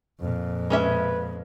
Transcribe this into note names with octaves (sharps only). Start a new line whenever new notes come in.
F2 A#2
G#3 C#4 B4 E5